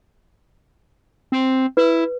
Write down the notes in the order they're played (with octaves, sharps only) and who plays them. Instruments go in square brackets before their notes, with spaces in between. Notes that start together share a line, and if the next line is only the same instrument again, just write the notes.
[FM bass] C4
[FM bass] E4 [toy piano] B4